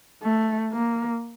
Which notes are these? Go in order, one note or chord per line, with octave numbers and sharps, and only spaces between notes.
A3
A#3